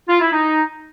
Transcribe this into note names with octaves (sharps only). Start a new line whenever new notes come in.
F4
E4
D#4